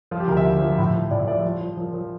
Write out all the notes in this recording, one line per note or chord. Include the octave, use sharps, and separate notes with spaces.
F3 F4
G4
D2 A#4
E5
D2
F3
A2
F3
A2 D5
E5
F3 D5
F3
F3
F3 A#4
F3